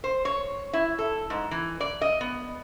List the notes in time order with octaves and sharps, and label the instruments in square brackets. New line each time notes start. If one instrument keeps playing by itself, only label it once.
[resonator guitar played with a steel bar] C5
C#5
E4
A4
G#2
E3
D5
D#5
B3